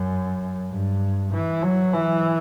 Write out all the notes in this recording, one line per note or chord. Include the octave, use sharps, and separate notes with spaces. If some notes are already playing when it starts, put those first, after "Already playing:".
Already playing: F#2
G2
E3
F#3
E3